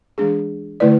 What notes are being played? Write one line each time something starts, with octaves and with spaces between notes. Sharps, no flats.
E3 G#3 D4 G#4
D3 A3 E4 B4 D5